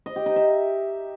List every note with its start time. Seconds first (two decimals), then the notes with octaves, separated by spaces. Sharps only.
0.06 D#5
0.16 G4
0.26 D#4
0.36 E5